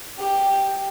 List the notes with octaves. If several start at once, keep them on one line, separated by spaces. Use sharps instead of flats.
G4